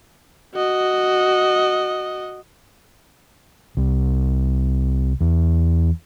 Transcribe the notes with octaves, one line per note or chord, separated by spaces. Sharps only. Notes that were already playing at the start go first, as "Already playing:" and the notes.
F#4 D#5
C2
E2